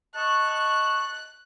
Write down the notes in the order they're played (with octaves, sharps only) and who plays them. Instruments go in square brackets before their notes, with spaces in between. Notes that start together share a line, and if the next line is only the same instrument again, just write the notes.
[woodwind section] D#5 A5 C#6 [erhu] F#6